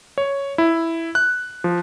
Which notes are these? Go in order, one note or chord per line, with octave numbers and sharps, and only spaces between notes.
C#5
E4
F#6
F3